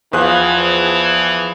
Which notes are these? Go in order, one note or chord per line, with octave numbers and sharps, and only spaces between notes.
E2 E3 F3 G#4 F#6